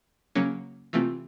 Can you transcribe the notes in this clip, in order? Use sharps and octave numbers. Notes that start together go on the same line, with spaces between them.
C#3 F#3 A#3 C#4
C3 E3 A3 C4 F4